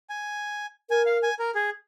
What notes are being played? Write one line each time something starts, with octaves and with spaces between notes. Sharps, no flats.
G#5
A#4 G#5
F5
G#5
A#4
G#4